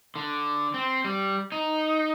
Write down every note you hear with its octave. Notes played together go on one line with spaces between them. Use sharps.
D3
C4
G3
D#4